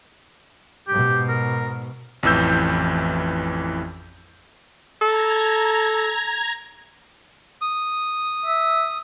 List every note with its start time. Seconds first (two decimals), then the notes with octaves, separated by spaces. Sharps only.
0.88 G#2 B2 G4
1.29 A#4
2.23 A1 F2 E3 E6 G6
5.02 A4 A#5 G#6
7.62 D#6
8.46 E5